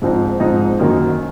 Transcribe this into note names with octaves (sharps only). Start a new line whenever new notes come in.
G#2 F3 C4 D#4
G#2 F3 C4 D#4
F#2 D#3 F#3 A#3 D#4